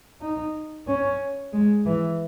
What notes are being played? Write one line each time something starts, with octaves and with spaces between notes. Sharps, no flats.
D#4
C#4
G#3
E3